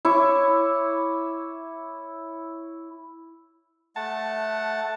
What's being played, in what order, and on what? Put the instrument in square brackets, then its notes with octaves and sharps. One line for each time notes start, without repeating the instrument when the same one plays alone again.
[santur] E4 C#5 D6
[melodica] A3 F#5 [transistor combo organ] A5